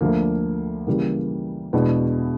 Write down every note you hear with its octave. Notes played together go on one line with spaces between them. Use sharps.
D2 D3 F3 A#3
C#3 E3 G3 A#3
E2 B2 G#3 B3 D4